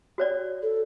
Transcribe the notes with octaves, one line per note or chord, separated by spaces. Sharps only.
F#4 C#5 D5
A4